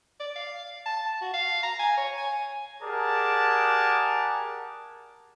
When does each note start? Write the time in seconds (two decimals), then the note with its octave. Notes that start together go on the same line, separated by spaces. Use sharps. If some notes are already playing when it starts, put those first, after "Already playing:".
0.20 D5
0.36 F5
0.86 A5
1.22 F#4
1.34 F5
1.63 A#5
1.80 G#5
1.98 C#5
2.18 G#5
2.82 G4 G#4 A#4 D5 F#5 A5